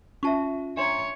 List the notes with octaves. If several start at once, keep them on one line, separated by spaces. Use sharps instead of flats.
C#4 F4 E5 A5 C#6
D4 C#5 E5 A#5 C6